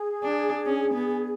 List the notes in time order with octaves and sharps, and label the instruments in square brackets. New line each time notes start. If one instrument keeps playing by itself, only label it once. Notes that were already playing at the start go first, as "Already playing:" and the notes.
Already playing: [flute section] G#4
[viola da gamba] D4
C#4
B3